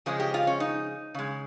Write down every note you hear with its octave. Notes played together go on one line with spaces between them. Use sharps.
C#3 F3 G#3 G#4
G4
F4
C#4
D#4
C#3 G#3